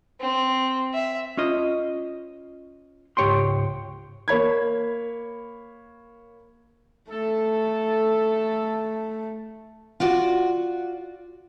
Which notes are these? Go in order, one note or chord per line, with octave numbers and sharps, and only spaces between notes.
C4
E5
C#4 F4 D#5
C#2 G#2 G4 C#5 G5 C6
A#3 C#5 B5 G#6
A3 A4
F4 F#4 D5